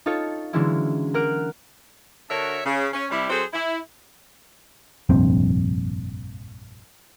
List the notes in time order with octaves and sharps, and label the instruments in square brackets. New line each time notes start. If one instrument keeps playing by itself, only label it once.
[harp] D#4 F4 A4 C#5
D3 E3 F#3 G#3 C#4 E4
A#3 A#4 F#5 F6 F#6 D7
[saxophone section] D3 D4 F#4 A#4 C#5 E5
C#3
C#4
C3 G3 E4
F#3 C4 G#4 A4 C5
E4
[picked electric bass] F1 A#1 G2 C4